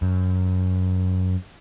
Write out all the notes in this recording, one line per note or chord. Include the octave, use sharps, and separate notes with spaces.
F#2